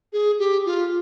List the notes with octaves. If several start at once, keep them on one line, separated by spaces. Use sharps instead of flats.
G#4
G4
F4